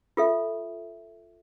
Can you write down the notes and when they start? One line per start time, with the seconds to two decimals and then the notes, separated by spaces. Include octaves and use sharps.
0.17 F4 A4 E5